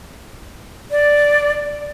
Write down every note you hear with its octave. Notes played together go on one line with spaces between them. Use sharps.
D5